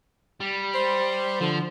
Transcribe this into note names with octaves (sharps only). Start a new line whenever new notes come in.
G3
C5
D3 F3